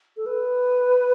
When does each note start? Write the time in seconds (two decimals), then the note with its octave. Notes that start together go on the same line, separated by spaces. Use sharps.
0.17 A4
0.26 B4